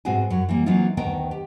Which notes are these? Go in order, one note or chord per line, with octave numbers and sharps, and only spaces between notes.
G#2 B2 C4 F#4 G#4 G#5
F#2 F#3
E3 G3 A#3
E3 F#3 A#3 C4 D#4 F4
D2 D#3 B3 D#4 A#4 G5
G4